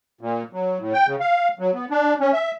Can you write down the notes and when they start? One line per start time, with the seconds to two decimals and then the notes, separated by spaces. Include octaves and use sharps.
0.21 A#2
0.53 F#3
0.79 A2
0.93 G5
1.07 C#3
1.20 F5
1.59 F#3
1.74 B3
1.91 D4
2.20 C#4
2.33 E5